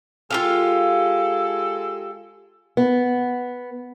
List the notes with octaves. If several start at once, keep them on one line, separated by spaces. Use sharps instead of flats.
G#3 F4 G4 A4 F5
B3